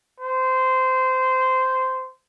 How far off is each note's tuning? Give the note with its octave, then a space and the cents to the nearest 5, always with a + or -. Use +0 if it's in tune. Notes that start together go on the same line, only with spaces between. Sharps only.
C5 -15